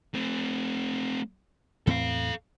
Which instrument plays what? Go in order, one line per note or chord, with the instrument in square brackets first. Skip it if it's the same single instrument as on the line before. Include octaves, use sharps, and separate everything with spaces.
[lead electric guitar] A3 C4
[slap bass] E2 A2 C4 [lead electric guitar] A4 F5